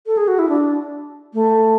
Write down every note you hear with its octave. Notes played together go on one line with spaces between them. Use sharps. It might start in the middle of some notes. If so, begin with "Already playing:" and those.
A4
G#4
F#4
E4
D4
A3